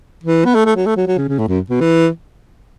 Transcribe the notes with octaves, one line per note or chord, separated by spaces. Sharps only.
E3
B3
A3
A3
F#3
A3
F#3
F#3
C#3
C#3
A2
F#2
B2
E3